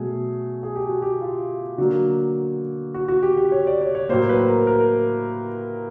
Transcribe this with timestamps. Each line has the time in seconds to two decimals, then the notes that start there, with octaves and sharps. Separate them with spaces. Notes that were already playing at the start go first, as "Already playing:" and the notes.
Already playing: B2 F#3 A3 G#4
0.63 G#4
0.76 G4
0.89 F#4
1.02 G4
1.21 F4
1.78 D3 F#3 A#3 F#4
2.94 F#4
3.08 F#4
3.23 G4
3.37 G4
3.52 C#5
3.67 D5
3.82 C#5
3.95 C#5
4.09 A2 F#3 A#3 C5
4.29 B4
4.48 A#4
4.67 A#4